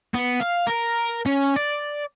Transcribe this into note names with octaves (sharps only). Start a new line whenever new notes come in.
B3
F5
A#4
C#4
D5